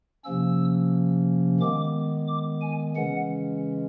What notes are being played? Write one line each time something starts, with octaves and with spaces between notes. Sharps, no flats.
C3 F3 A#3 C#4 E6
D#3 G#3 B3 D6
D6
G#5
C#3 E3 G#3 C#4 F#5